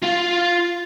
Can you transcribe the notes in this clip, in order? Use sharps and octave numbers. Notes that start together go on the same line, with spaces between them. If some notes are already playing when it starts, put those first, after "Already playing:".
F4 F5